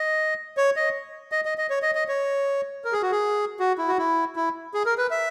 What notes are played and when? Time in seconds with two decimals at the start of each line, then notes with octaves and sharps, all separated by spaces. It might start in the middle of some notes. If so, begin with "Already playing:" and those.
Already playing: D#5
0.57 C#5
0.76 D#5
1.32 D#5
1.45 D#5
1.58 D#5
1.70 C#5
1.82 D#5
1.95 D#5
2.08 C#5
2.84 A#4
2.93 G#4
3.02 F#4
3.12 G#4
3.59 F#4
3.78 E4
3.88 F#4
3.98 E4
4.36 E4
4.74 G#4
4.86 A#4
4.98 B4
5.11 E5